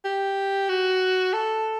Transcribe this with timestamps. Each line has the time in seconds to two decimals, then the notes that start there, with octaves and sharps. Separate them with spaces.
0.05 G4
0.69 F#4
1.33 A4